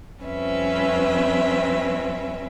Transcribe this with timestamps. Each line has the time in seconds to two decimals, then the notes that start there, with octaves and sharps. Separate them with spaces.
0.22 F2 G3 C4 C#4 B4 E5